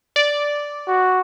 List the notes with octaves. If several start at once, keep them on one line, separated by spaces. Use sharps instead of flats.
D5
F#4